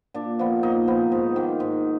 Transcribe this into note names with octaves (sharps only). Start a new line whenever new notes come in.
A#2 D4
F3 B3
A#2 D#4
F3 B3
G#2
D#3 A#3
G#2